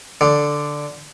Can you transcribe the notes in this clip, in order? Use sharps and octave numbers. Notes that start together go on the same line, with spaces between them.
D3